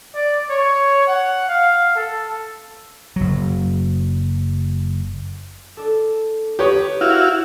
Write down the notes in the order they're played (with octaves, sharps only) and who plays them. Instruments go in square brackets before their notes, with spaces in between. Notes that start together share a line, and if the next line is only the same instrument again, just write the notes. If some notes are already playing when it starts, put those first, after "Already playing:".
[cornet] D5
C#5
F#5
F5
A4
[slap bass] F#1 F#3
[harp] D4 A4
[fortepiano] G4 B4 C#5 [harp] C#6 D#6 A#6
[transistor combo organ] E4 F#4 F5 [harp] C5